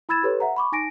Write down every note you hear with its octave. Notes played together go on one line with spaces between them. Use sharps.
E4 B5 E6 G#6 A6 E7
G4 A4 B4 C#5
E5 F#5 A#5
B5 C#6 D6
D#4 G#5 A#6 D7